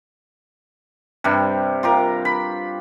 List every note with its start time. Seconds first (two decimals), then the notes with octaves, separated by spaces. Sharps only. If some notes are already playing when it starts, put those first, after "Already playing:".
1.24 G2 C3 G3
1.83 F4 G4 A#4
2.25 B5